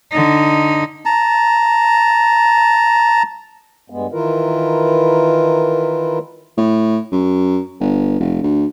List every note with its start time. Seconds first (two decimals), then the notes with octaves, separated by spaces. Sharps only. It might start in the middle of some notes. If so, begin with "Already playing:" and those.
0.12 D3 D#4
1.05 A5 A#5
3.90 G2 G#3 B3
4.12 D#3 E3 E4 F4 A#4 B4
6.57 A2
7.12 F#2
7.80 G1
8.20 F1
8.43 D2